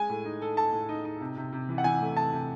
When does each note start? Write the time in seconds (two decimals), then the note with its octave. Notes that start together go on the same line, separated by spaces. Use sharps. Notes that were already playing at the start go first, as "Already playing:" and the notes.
Already playing: G#3 G#5
0.09 A2
0.25 D#4
0.42 A4
0.56 A4 A5
0.72 A2
0.89 D#4
1.05 D#4
1.21 C3
1.37 C3
1.52 C3
1.69 E3
1.78 F#5
1.84 E3 G#5
2.01 A3
2.17 C3 A5
2.33 C3